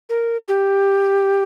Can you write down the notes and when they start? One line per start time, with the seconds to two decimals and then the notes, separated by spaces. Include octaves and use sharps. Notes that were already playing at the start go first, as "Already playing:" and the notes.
0.09 A#4
0.48 G4